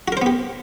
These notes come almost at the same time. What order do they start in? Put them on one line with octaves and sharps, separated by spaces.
F#4 A#4 C5 B3 G4